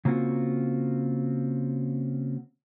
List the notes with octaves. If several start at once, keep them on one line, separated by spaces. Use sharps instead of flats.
C#3 A#3 C4 F4 F#4